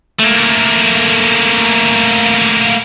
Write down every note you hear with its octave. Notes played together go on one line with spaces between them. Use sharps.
A3 A#3